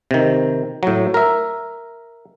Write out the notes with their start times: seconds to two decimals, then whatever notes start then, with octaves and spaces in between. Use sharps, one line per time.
0.11 C3 D#3
0.83 A2 F#3
1.14 A#4 E5